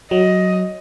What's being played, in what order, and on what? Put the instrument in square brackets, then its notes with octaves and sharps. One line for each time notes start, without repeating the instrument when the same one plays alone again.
[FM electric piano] F#3 [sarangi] D#5